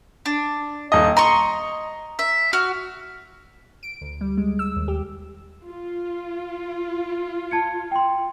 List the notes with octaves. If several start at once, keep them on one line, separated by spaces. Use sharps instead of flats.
D4
D#1 D#5
D#5 A#5 C6 C#6
E5
F#4 F6
D7
D2
G3
G#3
E6
D#2
G4
F4
A5 G#6 C#7
G5 C6